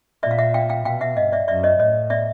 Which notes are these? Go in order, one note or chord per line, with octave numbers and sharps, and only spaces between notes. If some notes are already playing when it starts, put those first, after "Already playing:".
A#2 D5 E5
F5
E5 F#5
F5 G5
F5 G5
B2 F5 G5
E5 F#5
G2 D#5 F5
D5 E5
F#2 D5 E5
C#5 D#5
A2 C#5 D#5
D5 E5